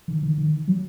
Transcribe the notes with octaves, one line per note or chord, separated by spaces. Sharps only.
D#3
D#3
D#3
F#3